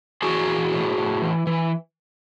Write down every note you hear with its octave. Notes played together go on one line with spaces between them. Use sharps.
E3 F#4 G#4
E3
A2
A2
E3
E3